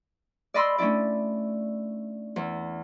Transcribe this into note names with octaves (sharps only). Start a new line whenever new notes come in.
D5 D#5 B5 C6 E6
A3 C#4 D4 E4 D5
E2